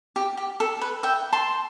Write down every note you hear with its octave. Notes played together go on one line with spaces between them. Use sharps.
G4
G4
A4
B4
E5 G5
A5 C6